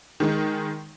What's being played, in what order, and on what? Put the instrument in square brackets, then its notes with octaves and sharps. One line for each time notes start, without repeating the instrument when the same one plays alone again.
[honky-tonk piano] D#3 G#3 D#4